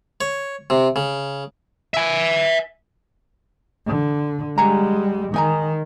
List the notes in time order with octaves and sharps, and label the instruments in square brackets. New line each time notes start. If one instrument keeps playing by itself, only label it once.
[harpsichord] C#5
C3
C#3
[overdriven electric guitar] E5 G#5
[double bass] D3
[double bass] G3 G#3 [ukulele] F#5 G#5 A#5
[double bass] D#3 [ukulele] D#4 G#5 A#5